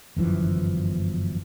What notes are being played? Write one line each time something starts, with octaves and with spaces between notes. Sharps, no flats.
G1 F#2 E3 F3